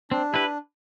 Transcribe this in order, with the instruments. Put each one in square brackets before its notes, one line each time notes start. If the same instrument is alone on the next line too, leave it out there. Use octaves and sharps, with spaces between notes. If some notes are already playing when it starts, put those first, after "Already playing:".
[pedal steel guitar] C4 [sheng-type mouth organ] D4
[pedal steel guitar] E4 B4 [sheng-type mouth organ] G4